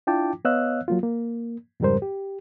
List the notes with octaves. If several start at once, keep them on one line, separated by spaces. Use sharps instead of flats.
D4 E4 F4 G5 A5 D6
B3 C#5 D#5 F5 E6 F#6
F#3 A#3 F4
A#3
F2 G#2 C#3 G3 A#4 C5
G4